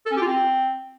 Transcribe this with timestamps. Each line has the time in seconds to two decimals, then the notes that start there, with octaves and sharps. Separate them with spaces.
0.06 A4
0.11 C#4
0.16 G4
0.21 F4
0.27 C4